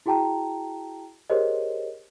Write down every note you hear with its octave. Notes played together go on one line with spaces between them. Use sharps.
E4 F#4 G#4 G5 A5 A#5
G4 G#4 A#4 C5 C#5 D#5